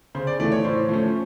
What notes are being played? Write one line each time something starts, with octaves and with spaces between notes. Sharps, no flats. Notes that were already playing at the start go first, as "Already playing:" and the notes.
C#3 C5
D5
E3 A3 D5
C#5
A2 C5
F3 A3 C#4